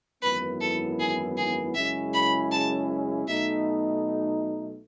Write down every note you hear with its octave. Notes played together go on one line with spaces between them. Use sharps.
G#1 F#2 E3 B3 E4 B4
A4
G#4
G#4
F#2 C#3 G#3 C#4 E4 E5
B5
A5
B1 B2 A3 D#4 E5